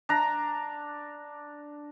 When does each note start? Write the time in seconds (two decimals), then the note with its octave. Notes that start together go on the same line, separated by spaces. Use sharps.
0.09 D4 A#5